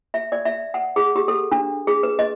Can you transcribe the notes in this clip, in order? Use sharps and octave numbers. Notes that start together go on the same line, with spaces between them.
E5
D5
E5
F#5
G#4
G4
A4
D4
G#4
B4
D#5